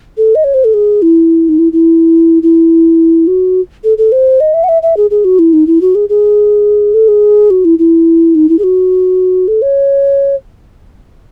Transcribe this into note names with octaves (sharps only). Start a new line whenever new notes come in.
A4
D#5
C#5
C5
A4
G#4
E4
D#4
E4
E4
E4
F#4
A4
A4
C5
D#5
E5
F#5
E5
E5
G#4
G#4
F#4
E4
D#4
E4
F#4
G#4
G#4
A4
G#4
F#4
E4
E4
D#4
E4
G#4
F#4
A4
C#5